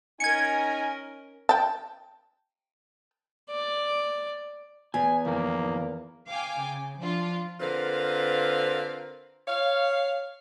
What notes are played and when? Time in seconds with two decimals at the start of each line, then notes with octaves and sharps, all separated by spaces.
0.20 C#4 D#4 A#4 G#5 G#6 C#7
1.49 G5 A5
3.51 D5
4.94 E2 G#5
5.26 F2 D#3 E3 A#3
6.29 F5 G5 G#5 D6
6.63 C#3
7.01 F3 D4 F4
7.60 D3 C4 F4 A#4 B4 F5
9.48 C#5 F5